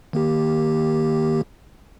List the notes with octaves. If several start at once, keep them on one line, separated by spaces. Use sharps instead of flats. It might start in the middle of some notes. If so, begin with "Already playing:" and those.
D#3 A#3 G4